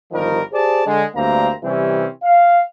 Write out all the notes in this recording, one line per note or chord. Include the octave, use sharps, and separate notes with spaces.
G1 D#3 F3 G3 A#4
G4 G#4 C5 D5 A5
D3 G#3
D2 G2 A#3 C4 A#5
C3 E3 G3 C4 C#4
F5